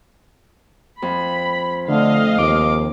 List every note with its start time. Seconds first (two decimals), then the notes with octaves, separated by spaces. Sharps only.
1.02 F2 B5
1.88 D3 A3 D#5 F5
2.39 D#2 D6